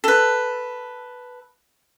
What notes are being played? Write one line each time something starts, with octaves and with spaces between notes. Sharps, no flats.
A4 B4